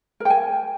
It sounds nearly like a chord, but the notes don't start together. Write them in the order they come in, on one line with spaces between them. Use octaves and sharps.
A#4 G5 G#5